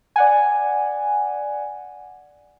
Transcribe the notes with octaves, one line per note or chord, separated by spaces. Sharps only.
D5 F#5 G#5